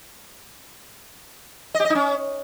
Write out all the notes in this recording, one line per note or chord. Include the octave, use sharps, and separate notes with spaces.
D#5
G4
D#5
D#4
C#4